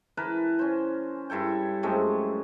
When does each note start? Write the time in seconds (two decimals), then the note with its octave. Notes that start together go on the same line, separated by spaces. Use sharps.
0.17 E3 A#4 B4 A5
0.59 C#4 C5
1.30 G2 E4 A4 G5
1.83 F#2 G#3 A3 C4